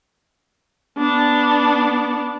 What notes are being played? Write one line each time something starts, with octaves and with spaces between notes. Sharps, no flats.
B3 D4